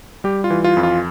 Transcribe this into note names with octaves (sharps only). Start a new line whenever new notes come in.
G3 G4
F4
E3
F4
F2
F4